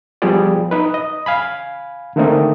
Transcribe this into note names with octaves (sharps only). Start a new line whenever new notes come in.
F3 G3 B3 G4 G#4 D5
D#4 B4
D#5
F5 G#5 B5
D3 D#3 A3 A#3 C4 D#4